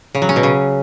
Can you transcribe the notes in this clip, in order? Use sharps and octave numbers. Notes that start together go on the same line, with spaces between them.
C#3
F#3
C#4
B2
C#3